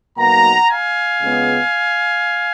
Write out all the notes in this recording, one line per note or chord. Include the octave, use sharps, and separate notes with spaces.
B1 B2 A#3 F#5 A#5
F5 G#5
C#2 C#3 G#3 B3